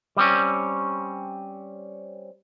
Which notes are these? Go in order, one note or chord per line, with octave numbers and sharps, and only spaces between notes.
G3 C4 C#4